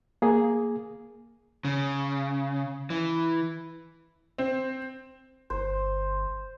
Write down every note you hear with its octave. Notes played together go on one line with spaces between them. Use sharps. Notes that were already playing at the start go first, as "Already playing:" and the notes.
A#3 G#4
C#3
E3
C4
G1 C5